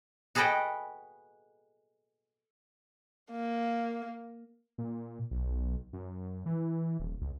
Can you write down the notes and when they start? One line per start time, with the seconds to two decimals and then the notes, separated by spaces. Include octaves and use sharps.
0.35 F#4 G#4 A4 B4 D#5 G5
3.31 A#3
4.78 A#2
5.31 B1
5.93 F#2
6.46 E3
6.99 D#1
7.21 C#2